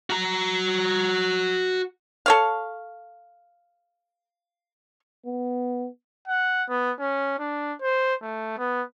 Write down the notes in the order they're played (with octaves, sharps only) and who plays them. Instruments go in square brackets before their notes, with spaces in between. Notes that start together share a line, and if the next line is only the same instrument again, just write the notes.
[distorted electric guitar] F#4 A#5
[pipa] A4 C#5 F5
[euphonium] B3
[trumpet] F#5
B3
C#4
D4
C5
A3
B3